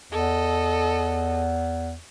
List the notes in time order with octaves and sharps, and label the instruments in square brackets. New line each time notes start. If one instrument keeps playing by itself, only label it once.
[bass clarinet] E2 [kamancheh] A4 D#5